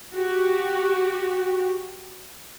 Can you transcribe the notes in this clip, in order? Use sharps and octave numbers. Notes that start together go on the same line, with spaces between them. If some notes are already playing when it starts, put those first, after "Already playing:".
F#4 G4